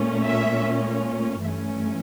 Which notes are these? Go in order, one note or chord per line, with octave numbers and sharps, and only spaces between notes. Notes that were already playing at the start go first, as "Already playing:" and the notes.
Already playing: A#2 A3 C#4
E5
G2 E3 A3 C#4 E5